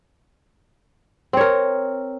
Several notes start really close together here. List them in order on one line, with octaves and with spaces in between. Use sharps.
C4 C#5 A#4